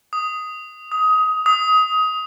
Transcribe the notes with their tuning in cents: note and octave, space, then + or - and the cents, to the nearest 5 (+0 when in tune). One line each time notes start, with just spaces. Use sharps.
D#6 +5
D#6 +20
D#6 +25